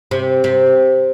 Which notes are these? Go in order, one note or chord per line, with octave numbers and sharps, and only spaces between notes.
C3
C3